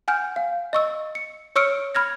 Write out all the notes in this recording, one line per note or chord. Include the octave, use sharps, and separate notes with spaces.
F#5 G#5 F6 G6
F5
D#5 C#6 E6
C#7
C#5 C#6 E6 F6 C#7 D7
B5 F6 G#6 A#6